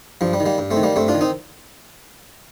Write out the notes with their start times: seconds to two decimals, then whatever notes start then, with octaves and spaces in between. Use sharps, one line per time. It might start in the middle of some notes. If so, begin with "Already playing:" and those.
0.21 G2 F3
0.33 G3
0.40 D#3
0.46 G3 A#3
0.58 G2
0.71 A3 C4
0.76 D#3
0.83 G3 A#3
0.96 G2 A3 C4
1.08 D4 F4
1.14 D#3
1.21 C4 D#4